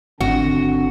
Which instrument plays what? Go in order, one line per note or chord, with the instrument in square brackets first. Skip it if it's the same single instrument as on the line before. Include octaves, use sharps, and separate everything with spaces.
[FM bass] G#1 [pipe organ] D3 C4 D4 [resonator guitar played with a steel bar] F#4